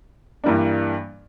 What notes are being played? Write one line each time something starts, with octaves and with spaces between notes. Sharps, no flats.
G2 E3 G3 A#3 D4